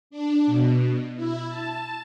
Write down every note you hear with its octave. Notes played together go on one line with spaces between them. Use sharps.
D4
B2
E4
A5